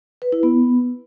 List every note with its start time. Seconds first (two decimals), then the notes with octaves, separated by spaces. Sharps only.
0.22 B4
0.32 E4
0.43 B3